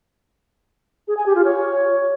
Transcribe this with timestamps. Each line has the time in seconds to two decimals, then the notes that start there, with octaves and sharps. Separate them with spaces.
1.08 G#4
1.17 G#5
1.26 G4
1.35 F4
1.45 C#5